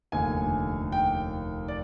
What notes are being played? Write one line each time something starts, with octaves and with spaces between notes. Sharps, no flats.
F1 D#2 D3 G#5
G5
D5